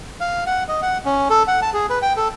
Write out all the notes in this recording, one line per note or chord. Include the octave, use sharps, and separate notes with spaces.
F5
F#5
D#5
F#5
C#4
A4
F#5
A5
G#4
B4
G5
A4